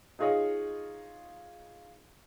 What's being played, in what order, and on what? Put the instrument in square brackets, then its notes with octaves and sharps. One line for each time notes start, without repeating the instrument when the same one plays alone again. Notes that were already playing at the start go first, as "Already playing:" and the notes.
[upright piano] D#4 F4 G#4 C#5 D#5 F5